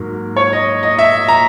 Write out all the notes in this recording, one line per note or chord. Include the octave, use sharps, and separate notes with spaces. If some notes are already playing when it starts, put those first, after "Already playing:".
Already playing: G#2 F#3 A#3
C#5
D#5
D#5
E5
A#5